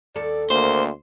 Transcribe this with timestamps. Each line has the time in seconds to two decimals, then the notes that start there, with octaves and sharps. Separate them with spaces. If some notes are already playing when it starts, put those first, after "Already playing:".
0.16 D#2 A4 D5
0.50 D2 A#3 C5